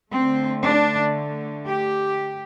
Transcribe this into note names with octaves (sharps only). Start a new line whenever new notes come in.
D3 A3 C4
D4
G4